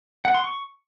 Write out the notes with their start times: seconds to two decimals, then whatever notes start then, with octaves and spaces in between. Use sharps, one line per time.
0.25 F#5
0.34 C6
0.44 C#6